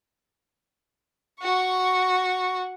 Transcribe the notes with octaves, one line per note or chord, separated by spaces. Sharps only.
F#4 C#6